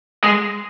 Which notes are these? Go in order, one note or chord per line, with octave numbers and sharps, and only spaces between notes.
G#3